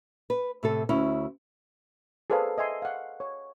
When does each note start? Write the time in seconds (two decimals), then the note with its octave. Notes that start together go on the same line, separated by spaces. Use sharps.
0.30 B4
0.63 A2 C3 A4
0.89 D2 C#4 E4
2.30 G#4 A4 B4 C5 D5 F5
2.58 D#5 E5 G#5 C6
2.82 F5 F#5
3.20 C#5